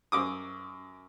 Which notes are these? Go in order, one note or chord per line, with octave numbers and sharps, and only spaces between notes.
F#2 D6 D#6